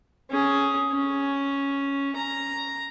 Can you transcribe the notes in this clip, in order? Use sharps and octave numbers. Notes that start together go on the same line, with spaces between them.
C#4 G#4
C#4
A#5